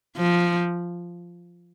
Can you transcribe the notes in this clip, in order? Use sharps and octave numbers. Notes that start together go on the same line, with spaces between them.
F3